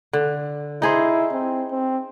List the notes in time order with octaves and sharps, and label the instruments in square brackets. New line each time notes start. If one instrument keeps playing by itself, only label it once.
[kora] D3
[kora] D#4 G#4 C5 [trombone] E4
[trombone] C4
C4